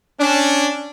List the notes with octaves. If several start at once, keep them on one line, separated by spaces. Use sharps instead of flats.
C#4 D4